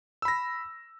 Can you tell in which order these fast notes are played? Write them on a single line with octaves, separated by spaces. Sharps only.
E6 B5 A#6